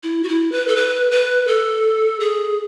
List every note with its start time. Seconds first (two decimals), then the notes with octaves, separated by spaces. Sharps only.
0.03 E4
0.23 F#4
0.28 E4
0.52 B4
0.68 A4
0.76 B4
1.11 B4
1.47 A4
2.20 G#4